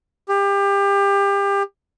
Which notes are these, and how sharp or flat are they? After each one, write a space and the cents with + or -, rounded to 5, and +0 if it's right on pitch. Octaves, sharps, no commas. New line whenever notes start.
G4 +30